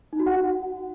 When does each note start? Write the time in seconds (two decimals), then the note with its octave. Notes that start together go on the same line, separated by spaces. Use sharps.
0.13 D#4
0.20 F#4
0.26 F#5